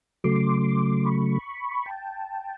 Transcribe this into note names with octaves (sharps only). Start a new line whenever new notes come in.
C#3 F#3 A3 C6 D6
B5 C#6
G5 A5